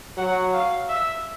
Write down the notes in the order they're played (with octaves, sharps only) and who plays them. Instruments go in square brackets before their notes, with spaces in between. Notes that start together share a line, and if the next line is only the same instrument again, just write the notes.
[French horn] F#3 [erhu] F#5
[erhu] F5
E5